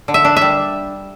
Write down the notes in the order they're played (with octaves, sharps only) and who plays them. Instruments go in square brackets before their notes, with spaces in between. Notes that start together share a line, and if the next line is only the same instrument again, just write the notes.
[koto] D3
E5
D4
G3 E5